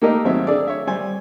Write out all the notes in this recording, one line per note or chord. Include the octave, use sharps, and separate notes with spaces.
A#3 D#4 G4 A4 A#4 D#5
G#1 F#3 C4 E5
D4 G#4 A4 D5
C#5 E5
G3 C5 G#5